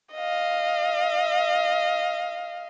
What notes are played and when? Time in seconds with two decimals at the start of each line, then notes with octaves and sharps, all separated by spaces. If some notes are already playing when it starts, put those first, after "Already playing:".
0.15 D#5 F5